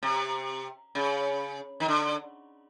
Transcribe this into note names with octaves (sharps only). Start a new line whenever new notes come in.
C3
C#3
D#3
D3